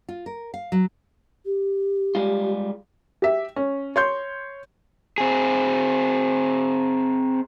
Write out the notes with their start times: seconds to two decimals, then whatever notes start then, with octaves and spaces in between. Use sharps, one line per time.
0.09 F4
0.26 A#4
0.54 F5
0.72 F#3
1.46 G4
2.15 G3 G#3 F4
3.22 G4 E5
3.56 C#4
3.96 C#5 C6 G6
5.18 C4 G#4